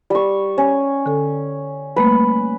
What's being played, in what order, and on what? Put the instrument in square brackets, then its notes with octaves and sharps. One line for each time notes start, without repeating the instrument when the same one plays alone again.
[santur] G3 C#6
C#4
[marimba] D3 A4
[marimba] G3 A3 A#3 [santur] B4